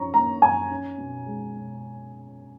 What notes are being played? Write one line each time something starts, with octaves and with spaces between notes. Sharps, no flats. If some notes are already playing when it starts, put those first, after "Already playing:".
Already playing: F#2 F3 C#4 A#5 C#6
A#3 A#5
F#2 G#5
C#4
B2
G#3
B2